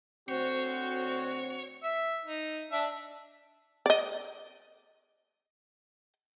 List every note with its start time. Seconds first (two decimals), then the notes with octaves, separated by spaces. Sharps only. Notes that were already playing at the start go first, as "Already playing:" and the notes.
0.29 D2 C4 F#4 C5 C#5
1.84 E5
2.25 D#4
2.72 D4 E5
3.86 D5 D#5